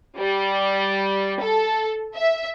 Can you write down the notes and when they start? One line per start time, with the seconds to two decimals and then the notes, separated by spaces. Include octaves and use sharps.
0.17 G3
1.39 A4
2.14 E5